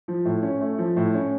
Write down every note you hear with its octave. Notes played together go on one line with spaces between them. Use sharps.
F3
A2
C#4
A3
F3
A2
C#4